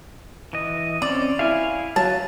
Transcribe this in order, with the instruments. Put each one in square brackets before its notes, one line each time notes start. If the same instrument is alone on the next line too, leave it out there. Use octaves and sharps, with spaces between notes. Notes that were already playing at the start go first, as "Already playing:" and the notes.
[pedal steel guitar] E3 D#5
[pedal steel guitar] C4 C#4 [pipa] D5
[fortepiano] E4 [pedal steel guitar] F5 G#5 F6
[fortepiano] F#3 [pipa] A5